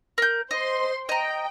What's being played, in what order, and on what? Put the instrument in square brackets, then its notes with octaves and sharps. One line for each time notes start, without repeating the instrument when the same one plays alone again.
[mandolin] A#4 G6
[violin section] C5 C6 [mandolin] D#5
[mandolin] D#5 A#5 [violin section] G5